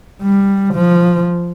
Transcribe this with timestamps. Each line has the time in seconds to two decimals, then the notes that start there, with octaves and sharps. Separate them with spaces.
0.22 G3
0.75 F3